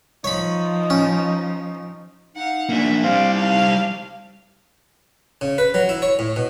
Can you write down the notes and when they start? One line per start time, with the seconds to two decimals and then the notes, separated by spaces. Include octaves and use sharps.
0.24 F3 D#4 C#5 B5
0.90 C#4
2.36 D#4 F5 F#5
2.69 A#3 D4 E5
3.04 G3 C4 C5 D5 F5
3.34 D4 D#4 F5
5.41 C#3
5.58 B4
5.74 F#3
5.89 E4
6.02 C#5
6.19 A2
6.36 B2